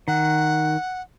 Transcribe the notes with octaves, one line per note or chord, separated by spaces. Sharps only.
D#3 F#5